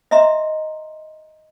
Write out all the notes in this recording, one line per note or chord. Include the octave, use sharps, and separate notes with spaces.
D#5 E5 A#5 C6